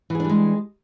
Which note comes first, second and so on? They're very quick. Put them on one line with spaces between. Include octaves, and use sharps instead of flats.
E3 G#4 D4 G3 G#3